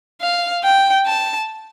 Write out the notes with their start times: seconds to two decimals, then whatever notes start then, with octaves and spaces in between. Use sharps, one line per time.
0.22 F5
0.64 G5
1.07 A5